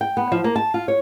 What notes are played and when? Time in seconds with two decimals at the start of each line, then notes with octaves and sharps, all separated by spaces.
0.01 G5
0.17 B3
0.32 F3
0.44 A#3
0.56 A5
0.74 F4
0.88 C#5